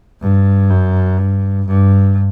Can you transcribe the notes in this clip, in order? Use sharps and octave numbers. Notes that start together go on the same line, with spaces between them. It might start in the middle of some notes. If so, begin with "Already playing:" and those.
G2
F#2
G2
G2